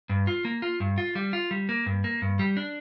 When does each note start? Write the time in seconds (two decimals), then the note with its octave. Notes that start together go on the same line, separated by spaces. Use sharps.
0.09 G2
0.27 F4
0.45 A#3
0.62 F4
0.80 G2
0.98 F4
1.15 G3
1.33 F4
1.51 G3
1.69 A#3
1.86 G2
2.04 A#3
2.22 G2
2.39 G3
2.57 D4